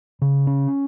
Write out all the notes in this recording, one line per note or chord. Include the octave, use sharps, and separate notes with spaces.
C#3
C#4